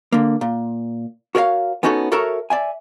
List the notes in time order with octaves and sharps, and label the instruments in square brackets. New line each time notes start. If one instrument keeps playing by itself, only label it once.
[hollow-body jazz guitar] D3 A#3
A#2
F#4 A#4 C#5 D5 F5
B3 C#4 D#4 F#4 A4 C#5
F#4 A4 A#4 C#5 E5 A#5
D5 E5 G#5